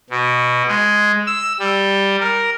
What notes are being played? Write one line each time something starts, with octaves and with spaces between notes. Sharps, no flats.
B2
G#3
E6
G3
A#4